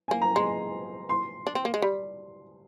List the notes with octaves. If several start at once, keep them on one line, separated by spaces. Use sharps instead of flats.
A#3 G#5
A#5
G#3 C6
C6
D4
C4
A#3
G#3
G3